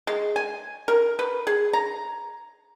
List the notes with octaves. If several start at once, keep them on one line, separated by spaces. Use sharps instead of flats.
G#3
G#5
A#4
B4
G#4
A#5